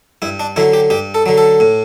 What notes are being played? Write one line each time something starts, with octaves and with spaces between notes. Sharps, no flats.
G2 E4
D4
D3 F#3 E4
G4
G2 G4
A4
D3 F#3
A4
A2